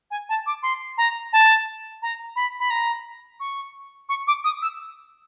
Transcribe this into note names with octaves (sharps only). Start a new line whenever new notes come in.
G#5
A5
D6
C6
A#5
A5
A#5
B5
B5
A#5
C#6
C#6
D6
D#6
E6